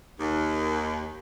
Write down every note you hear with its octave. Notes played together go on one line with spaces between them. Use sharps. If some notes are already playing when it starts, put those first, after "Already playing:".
D#2